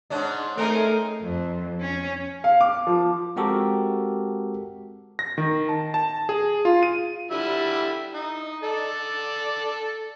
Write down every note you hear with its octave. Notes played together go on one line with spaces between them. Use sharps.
G#2 C#4 D4
A3 C4 D#4 G#4 A#4
F2
C#4
F5
D6
F3
G#3 C4 F#4 G4 A4 A#4
A#6
D#3
A5
A5
G#4
F4
D#7
D3 G3 E4
D#4
A4 D5